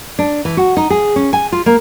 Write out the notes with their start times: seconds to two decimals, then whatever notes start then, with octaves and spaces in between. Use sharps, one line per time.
0.19 D4
0.45 E3
0.57 F#4
0.77 D#4
0.90 G#4
1.16 C#4
1.33 G#5
1.52 F4
1.66 A#3